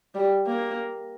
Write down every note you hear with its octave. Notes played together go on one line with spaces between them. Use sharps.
G3
A#3